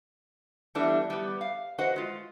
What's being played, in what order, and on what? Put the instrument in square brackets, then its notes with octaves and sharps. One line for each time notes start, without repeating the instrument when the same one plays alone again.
[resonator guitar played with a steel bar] E3 G3 A3 B3 D4 E4
G3 B3
F5
F#4 B4 C5 D#5 F#5
G#3 F4